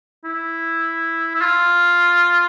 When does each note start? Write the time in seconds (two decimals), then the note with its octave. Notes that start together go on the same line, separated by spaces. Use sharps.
0.25 E4
1.35 E4
1.41 F4